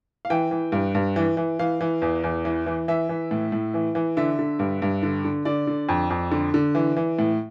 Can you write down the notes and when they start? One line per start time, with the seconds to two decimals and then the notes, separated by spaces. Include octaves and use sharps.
0.25 F5
0.30 E3 G5
0.51 E3
0.72 G2
0.95 G2
1.16 E3
1.37 E3
1.59 E3 F5
1.81 E3
2.02 E2
2.24 E2
2.45 E3
2.66 E3
2.88 E3 E5
3.09 E3
3.31 A2
3.52 A2
3.74 E3
3.95 E3
4.17 D3 E5
4.39 D3
4.59 G2
4.82 G2
5.03 D3
5.25 D3
5.45 D3 D5
5.67 D3
5.89 F2
6.10 F2
6.31 D3
6.54 D3
6.75 E3
6.96 E3
7.19 A2